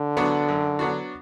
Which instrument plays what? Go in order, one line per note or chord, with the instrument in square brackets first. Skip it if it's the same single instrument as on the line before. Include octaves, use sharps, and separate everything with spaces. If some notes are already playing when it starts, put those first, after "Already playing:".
Already playing: [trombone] D3
[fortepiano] F#3 B3 D4 F#4
F#2
F#3 B3 D4 F#4